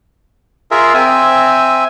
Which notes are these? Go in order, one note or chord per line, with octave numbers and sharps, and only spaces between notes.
F4 G#4 A#4 E5
C4 E5 G#5